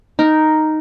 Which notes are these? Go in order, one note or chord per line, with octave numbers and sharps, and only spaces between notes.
D#4 A#4